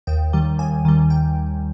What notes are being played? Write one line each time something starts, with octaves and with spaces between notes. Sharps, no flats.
D#2 G5
D#3 G3
D#2 G#5
D#3 G3
G5